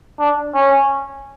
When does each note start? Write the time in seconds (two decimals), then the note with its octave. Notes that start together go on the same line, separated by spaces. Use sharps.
0.19 D4
0.55 C#4